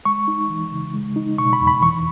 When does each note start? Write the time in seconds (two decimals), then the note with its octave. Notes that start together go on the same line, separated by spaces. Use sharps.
0.05 G#3 C#6
0.28 D#4
0.50 E3
0.72 C#3
0.94 G#3
1.16 D#4
1.38 B2 C#6
1.53 B5
1.60 E2
1.67 B5
1.82 E3 C#6